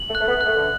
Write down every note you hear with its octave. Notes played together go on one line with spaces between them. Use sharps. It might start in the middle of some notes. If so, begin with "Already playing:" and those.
Already playing: F#7
A3
F#6
A3
B3
F#6
A3
D3